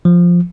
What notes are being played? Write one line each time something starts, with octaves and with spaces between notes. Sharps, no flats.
F3